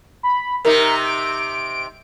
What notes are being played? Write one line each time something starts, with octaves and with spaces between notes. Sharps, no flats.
B5
C3 D#4 A#4
D7